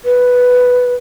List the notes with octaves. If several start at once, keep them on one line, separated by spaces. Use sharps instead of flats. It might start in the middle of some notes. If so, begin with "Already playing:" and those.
B4